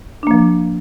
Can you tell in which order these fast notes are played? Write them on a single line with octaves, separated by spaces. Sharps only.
D4 A#3 F3